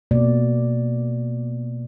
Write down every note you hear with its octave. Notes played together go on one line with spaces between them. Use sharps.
B2 A#3 D5